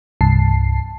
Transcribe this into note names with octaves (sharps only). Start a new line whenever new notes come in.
C2 G2 A5 C7